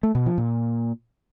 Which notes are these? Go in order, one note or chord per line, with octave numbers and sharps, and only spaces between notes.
A3
B2
F3
A#2